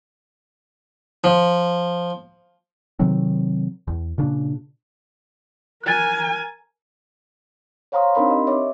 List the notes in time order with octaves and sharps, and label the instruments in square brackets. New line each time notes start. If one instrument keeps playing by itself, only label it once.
[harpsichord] F3
[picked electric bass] C3 D#3 F#3 C4
E2
A#2 C#3 D4
[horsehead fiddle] A#4 G#5 [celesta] F#6 A6
[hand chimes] C5 C#5 F5 A#5 C6 D#6
C4 D4 D#4 A#4 B5 C6
G4 D#5
C#5 E5 D6